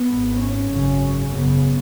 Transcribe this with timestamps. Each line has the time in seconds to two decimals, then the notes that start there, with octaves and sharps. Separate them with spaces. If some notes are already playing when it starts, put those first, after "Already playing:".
Already playing: B3
0.09 G#1 G#2
0.40 C#4
0.71 G#1 F#2 C#3
1.33 G#1 F#2 C#3 B3